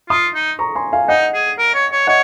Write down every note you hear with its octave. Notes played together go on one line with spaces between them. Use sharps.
F4 C6 D#6
D#4
A#5 C#6
G#5 C6
F5 G#5
D#4 D#5 F#5
G#4
A#4
C#5
C#5
C#5 D#5 F#5